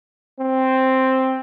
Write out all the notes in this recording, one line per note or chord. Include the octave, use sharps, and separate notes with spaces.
C4